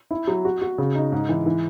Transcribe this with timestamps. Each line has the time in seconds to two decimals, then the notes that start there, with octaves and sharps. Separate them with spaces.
0.11 E4
0.27 F#3
0.45 F#4
0.62 F#4
0.78 C#3
0.95 D#4
1.12 G#2
1.29 E3
1.46 E3